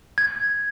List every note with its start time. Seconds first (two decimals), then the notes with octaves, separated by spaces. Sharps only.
0.18 G#6